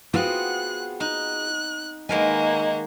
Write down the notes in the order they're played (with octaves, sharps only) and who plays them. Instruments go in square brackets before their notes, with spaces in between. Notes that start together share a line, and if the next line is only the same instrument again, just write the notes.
[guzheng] B3 C4 [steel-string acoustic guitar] F4 F#4 G#4 [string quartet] F#6
[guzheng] D#4 [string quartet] F#6
[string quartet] D#3 A#3 F#5 [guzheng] G#3 A#4 G#5 [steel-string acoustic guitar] B4 [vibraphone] D#5